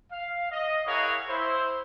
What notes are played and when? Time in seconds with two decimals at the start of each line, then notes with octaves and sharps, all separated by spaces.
0.11 F5
0.51 D#5
0.86 E4 G#4 A#4 C#5 F5 F#5
1.28 E4 C5